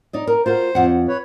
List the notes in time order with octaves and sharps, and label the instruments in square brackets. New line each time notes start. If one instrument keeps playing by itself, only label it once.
[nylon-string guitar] D#4 D5 D#5
A#4
[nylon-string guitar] F4 F#4 A#4 [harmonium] C5
[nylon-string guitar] F2 F#5
[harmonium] B4 C#5